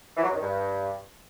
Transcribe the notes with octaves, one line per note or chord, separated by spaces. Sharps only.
E3
F#3
F#2
D#3
G2